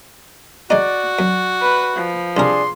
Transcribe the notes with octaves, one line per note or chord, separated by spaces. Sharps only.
G#3 D#4 F#4 D5
F#2
B4
F3
C2 D4 G#4 A#4 C6